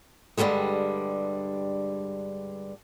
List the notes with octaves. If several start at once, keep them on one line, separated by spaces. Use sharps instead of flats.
G2 D3 D#3 G3 G#3